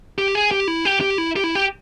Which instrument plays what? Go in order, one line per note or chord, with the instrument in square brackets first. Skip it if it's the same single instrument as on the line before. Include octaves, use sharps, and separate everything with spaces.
[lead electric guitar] G4
G#4
G4
E4
G4
G4
E4
G4
E4
G4